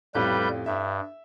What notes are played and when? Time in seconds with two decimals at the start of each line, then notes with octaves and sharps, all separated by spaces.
0.15 A1 F2 G3 G4 B4 G6
0.66 G2 E5